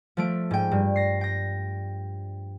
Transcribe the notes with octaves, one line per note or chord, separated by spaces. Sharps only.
F3 A3 D7
G#2 G5
G2
A#6 C7
G5 A#6